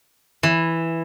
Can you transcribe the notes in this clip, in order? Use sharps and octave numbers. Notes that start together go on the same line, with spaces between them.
E3